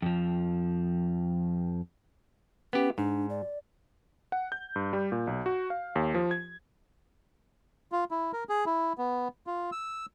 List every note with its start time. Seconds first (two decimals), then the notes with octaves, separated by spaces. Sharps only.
0.02 F2 F3
2.73 B3 C#4 G4
2.98 G#2 D4
3.30 D5
4.32 F#5
4.52 G6
4.76 G2
4.93 G3
5.12 A#2
5.27 B1
5.46 F#4
5.70 F5
5.95 D#2
6.14 F3
6.31 G#6
7.92 F4
8.11 E4
8.33 A#4
8.49 G#4
8.66 E4
8.98 B3
9.47 F4
9.72 E6